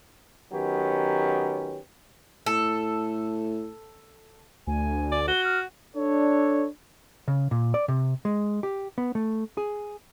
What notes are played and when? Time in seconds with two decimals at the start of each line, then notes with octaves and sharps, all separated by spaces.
0.53 D#3 F#3 B3 C#4 G4
2.46 A2 A4
4.67 D2 G#5
5.12 D5
5.28 F#4 G7
5.44 F6
5.95 D4 A4 C#5
7.28 C#3
7.51 A#2
7.74 D5
7.88 C3
8.25 G#3
8.63 G4
8.98 B3
9.15 A3
9.57 G#4